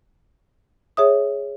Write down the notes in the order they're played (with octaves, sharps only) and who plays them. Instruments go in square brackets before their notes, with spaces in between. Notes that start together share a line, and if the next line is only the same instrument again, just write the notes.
[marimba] G#4 C#5 E5 D#6